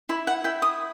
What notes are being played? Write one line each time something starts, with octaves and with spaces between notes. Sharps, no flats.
E4 B5
F#5
E4 G5
D#6